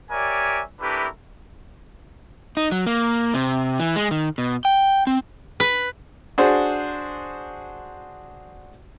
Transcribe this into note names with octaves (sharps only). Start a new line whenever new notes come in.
G4 A#4 C#5 D5 E5 G#5
A3 D4 E4 G4 A#4 B4
D#4
F#3
A#3
C3
E3
G#3
D#3
B2
G5
C4
B4
D4 F#4 G#4 C5